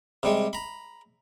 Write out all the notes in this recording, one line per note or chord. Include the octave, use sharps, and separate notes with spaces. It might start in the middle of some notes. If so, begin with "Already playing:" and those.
C3 G3 G#3
A#5 B5